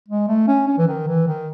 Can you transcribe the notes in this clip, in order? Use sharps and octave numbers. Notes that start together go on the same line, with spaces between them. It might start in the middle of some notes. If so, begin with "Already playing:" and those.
G#3
A3
C#4
C#4
E3
D#3
E3
D#3